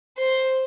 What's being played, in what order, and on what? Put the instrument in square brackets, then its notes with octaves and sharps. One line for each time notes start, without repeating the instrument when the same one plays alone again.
[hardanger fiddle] C5